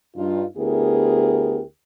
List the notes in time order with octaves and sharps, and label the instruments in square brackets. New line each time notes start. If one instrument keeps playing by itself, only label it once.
[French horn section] G2 D#4 F4
D2 B3 E4 G4 G#4 A#4